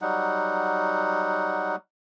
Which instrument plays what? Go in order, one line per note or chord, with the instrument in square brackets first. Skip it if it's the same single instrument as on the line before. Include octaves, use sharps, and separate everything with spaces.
[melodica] F#3 G3 D#4 F#5